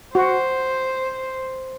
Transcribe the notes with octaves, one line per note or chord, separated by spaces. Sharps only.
F#4 C5